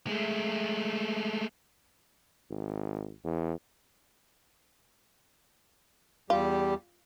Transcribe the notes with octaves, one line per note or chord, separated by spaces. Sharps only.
G#3 A3
G#1
E2
E2 G3 F4 G4